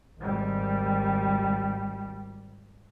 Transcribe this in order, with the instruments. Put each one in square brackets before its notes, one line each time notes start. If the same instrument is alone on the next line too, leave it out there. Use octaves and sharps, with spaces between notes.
[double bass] G#1 G3